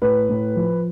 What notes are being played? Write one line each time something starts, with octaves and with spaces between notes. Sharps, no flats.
A2 B4
A2
F3